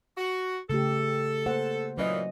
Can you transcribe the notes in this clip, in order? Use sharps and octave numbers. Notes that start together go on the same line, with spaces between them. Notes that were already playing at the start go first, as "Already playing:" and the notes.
F#4
C#3 A3 G4 A4
A#3 C5 F#5
A#2 E3 F#3 C#4 D#5